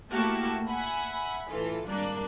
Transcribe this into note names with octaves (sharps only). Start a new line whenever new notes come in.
A3 A#3 E4 F#4 G4 A5
E5 F#5 G#5 B5
A2 E3 F4 A4
G#1 G3 A#3 D4 F#6